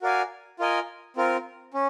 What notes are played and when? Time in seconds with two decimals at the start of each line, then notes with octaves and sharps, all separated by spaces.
0.02 F#4 A#4 D5 F5 G#5
0.59 F4 A#4 D#5 G#5
1.17 C4 F4 A#4
1.74 C#4